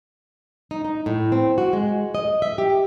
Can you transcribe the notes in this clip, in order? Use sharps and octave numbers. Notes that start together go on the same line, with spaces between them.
D#4
D#4
A2
C4
F#4
G#3
D#5
E5
G4